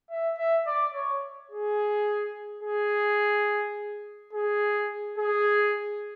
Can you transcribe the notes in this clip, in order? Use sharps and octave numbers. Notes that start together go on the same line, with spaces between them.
E5
E5
D5
C#5
G#4
G#4
G#4
G#4